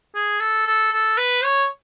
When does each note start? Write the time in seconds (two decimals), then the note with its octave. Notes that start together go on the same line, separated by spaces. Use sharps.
0.15 G#4
0.40 A4
0.66 A4
0.92 A4
1.17 B4
1.44 C#5